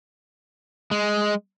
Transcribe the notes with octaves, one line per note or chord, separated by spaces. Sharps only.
G#3